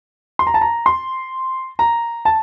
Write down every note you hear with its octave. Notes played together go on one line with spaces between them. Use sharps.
C6
A#5
A5
A#5
C6
A#5
A5